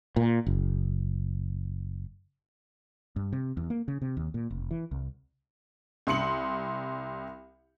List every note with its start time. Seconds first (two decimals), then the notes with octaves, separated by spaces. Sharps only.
0.16 A#2
0.47 F#1
3.16 G2
3.33 C3
3.57 E2
3.70 A#3
3.88 C#3
4.02 C3
4.17 D#2
4.34 A#2
4.51 F1
4.71 E3
4.91 C2
6.07 C2 C6 C#7 F#7